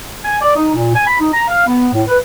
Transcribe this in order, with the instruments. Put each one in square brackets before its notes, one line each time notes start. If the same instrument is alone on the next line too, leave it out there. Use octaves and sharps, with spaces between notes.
[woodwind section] G#5
D5
D#4
A#2
G#5
B5
D#4
A#5
F5
B3
A2
B4